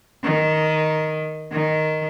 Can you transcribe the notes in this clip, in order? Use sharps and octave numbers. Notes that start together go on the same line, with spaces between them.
D#3
D#3